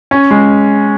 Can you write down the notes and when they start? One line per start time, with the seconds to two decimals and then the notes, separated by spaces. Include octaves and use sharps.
0.11 C#4
0.31 G#3